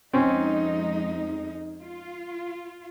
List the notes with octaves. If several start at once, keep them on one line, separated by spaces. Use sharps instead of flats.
F2 G#3 C4 C#4 D#4
F4